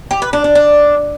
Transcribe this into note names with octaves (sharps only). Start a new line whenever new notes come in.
G4
B4
D4
D4
D4